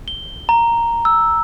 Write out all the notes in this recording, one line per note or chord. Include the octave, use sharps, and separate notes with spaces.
G7
A#5
E6